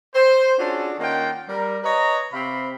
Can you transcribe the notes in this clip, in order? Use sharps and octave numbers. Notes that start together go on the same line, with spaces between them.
C5
C#4 D4 F4 F#4 G#4 A4
D#3 A#3 C#4 F4 F#5 G5
G3 A#4
B4 C#5 D#5 A#5
C3 C4 F5 B5